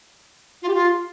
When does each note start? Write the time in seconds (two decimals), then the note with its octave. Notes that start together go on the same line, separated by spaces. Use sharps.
0.62 F4
0.68 G4
0.74 F4